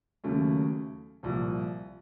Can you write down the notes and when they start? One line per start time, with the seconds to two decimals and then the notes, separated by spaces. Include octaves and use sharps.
0.24 D#2 C#3 F#3 A3 C#4
1.23 C2 A#2 F3